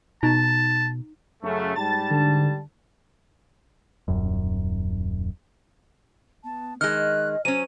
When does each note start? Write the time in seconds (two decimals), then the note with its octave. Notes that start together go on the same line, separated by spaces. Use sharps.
0.23 B2 D#4 A5 A#5
1.43 F#2 C#3 A3
1.75 G#2 G3 A5 A6
2.11 D3
4.08 D#1 F#2
6.44 B3 A5
6.81 D#3 G#3 D#5 F6 F#6
7.45 F#3 C#4 C5 G#5 D#7